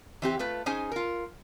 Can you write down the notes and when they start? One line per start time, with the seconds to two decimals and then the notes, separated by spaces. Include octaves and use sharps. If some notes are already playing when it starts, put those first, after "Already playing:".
0.22 E3 C4 G4
0.39 A3 F4 B4
0.66 C#4 D#4 G#4 C5 G#5
0.92 F4 A#4